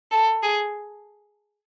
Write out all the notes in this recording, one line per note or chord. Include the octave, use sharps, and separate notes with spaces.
A4
G#4